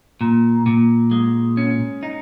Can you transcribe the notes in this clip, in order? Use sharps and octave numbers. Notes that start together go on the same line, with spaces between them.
A#2
A#2
G#3
C#4
D#4